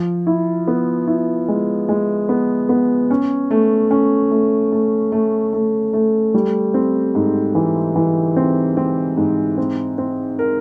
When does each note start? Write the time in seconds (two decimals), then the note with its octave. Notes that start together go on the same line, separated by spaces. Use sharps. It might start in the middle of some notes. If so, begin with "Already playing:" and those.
Already playing: F3
0.27 E4
0.68 B3
1.07 E4
1.48 G#3
1.89 G#3
2.29 B3
2.69 B3
3.11 C#4
3.51 A3
3.91 C#4
4.31 A3
4.72 A3
5.12 A3
5.53 A3
5.93 A3
6.34 G3
6.74 C4
7.15 G#2
7.55 E3
7.96 E3
8.37 C4
8.77 C4
9.17 G#2
9.58 C4
9.98 C4
10.39 A#4